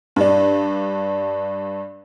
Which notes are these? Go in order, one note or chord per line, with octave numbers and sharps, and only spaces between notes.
G2 D4